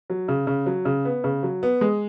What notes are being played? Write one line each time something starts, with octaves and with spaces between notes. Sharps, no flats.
F#3
C#3
C#3
F#3
C#3
B3
C#3
F#3
B3
G#3